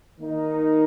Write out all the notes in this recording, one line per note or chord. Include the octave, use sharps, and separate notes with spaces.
D#3 A#3 D#4 A#4